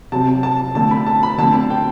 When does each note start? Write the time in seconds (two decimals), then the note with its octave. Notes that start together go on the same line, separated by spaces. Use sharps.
0.12 C3 F#3 C4 A5
0.43 A5
0.75 D3 A3 C4 A5
0.91 B5
1.06 A5
1.23 B5
1.38 D3 A3 C4 A5
1.70 G5